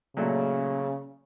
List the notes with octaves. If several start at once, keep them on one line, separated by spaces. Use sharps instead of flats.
A#2 C#3 F#3 A3